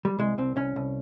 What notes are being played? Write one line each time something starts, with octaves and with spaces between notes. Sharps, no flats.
G3
C2 G#3
C2 C4
C2 C#4
C2